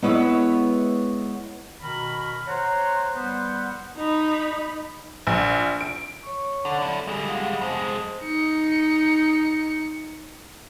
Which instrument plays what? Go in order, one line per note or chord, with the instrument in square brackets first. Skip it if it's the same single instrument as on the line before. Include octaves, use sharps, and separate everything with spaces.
[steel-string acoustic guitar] G#3 B3 E4 B4 C#5 E5
[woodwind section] B2 D#3 A#4 B5
C5 C#5 F#5 A#5 C6
G3 B3 B4 C5 F#5
[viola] D#4 B5
[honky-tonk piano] A#1
D7
[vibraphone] C#5 C#6
[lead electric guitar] D3 [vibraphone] A4
[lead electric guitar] D4 E4
G3 G#3
[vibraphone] F5 F#5 D#6
[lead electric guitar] F2 G#3 [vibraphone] C5
[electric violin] D#4 C#7